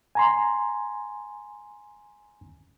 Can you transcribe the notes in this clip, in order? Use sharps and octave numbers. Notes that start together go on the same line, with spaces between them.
G#5 A#5 C6